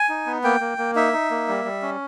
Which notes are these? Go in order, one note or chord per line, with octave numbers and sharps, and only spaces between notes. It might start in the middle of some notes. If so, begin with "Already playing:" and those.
Already playing: G#5
D#4
B3
A#3 G5
A#3
A#3
D#4 E5
D#4
A#3
G3
G3
C#4